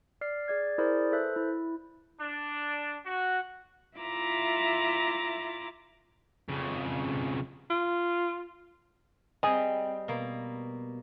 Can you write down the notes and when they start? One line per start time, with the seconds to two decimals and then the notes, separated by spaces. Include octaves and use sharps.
0.21 D5 F6 C7
0.48 G#4 D5 G#6
0.78 E4 G#4 A#4 C5 D5
1.12 A4 B4 C5 E5 F#6
1.36 E4
2.20 D4
3.05 F#4
3.98 E4 F4 E5 A#5 C6 D6
6.49 F2 C#3
7.70 F4
9.43 G3 C4 G#4 D#5
10.08 B2 A#3